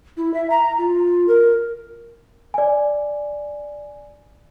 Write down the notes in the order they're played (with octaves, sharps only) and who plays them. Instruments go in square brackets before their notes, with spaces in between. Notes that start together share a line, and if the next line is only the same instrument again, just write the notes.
[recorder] E4
E5
A#5
F4
A#4
[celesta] D5 G#5